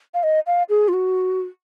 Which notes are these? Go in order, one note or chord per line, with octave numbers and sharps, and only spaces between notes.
F5
D#5
F5
G#4
F4
F#4